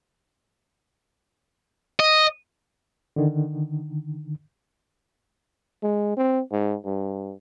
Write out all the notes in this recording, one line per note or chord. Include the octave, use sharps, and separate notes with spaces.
D#5
D3 D#3
G#3
C4
G#2
G2